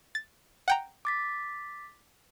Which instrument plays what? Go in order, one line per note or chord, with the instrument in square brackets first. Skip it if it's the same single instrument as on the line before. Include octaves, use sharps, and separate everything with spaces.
[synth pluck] A6
F#5 G5 A#5
[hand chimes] D6 A6 B6